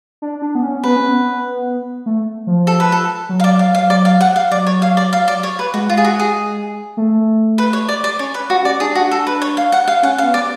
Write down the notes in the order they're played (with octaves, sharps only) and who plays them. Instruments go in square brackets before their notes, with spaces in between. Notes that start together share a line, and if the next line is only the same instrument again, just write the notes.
[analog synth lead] D4
D4
B3
C#4
[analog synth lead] B3 [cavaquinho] B4
[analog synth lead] C#4
B3
A3
F3
[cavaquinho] A4
B4
A4
[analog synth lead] F#3
[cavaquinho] F5
D5
F5
F5
D5
F5
F#5
F5
[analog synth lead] F#3 [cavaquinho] D5
[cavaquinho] C#5
F5
D5
F5
D5
C#5
B4
[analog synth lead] G#3 [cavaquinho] F#4
[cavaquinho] F4
G#4
F#4
G#4
[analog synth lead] A3
[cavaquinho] B4
C#5
D5
D5
[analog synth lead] C#4 [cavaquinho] C#5
[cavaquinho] B4
F#4
D5
[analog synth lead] D4 [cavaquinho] G#4
[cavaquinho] F#4
A4
B4
C#5
F5
F#5
F5
[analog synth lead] C#4 [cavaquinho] F#5
[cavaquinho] F5
[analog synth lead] B3
[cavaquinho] D5